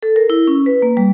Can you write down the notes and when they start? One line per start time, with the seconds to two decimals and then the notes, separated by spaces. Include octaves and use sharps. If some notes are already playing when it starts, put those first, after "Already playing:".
0.03 A4
0.16 A#4
0.30 E4
0.47 C#4
0.66 B4
0.82 A#3
0.97 G3